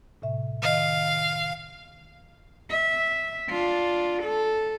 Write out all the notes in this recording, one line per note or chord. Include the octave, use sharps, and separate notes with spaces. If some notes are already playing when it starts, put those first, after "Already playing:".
A2 C3 E5
D#3 D#5 F5
E5
D4 F4
A4